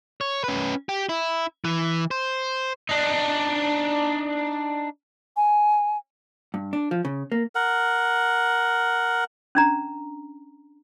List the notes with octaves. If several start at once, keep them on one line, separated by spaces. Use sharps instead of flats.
C#5
C#4 B4
G4
E4
E3
C5
D4 D#4
G#5
G2
D4
F3
C#3
A#3
A#4 F#5
C#4 D4 A#5